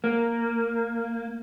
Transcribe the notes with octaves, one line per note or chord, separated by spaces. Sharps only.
A#3